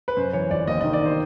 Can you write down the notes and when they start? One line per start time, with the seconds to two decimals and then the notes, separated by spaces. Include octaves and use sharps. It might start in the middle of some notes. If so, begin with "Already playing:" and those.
0.08 B4
0.17 F#2 C5
0.33 E3 C#5
0.51 G1 D5
0.67 D#2 D#5
0.81 D#3 D#5
0.93 D5
1.02 D#3 C5